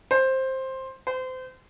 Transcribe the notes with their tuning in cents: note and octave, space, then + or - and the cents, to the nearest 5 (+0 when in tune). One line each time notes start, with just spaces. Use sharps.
C5 +10
C5 -30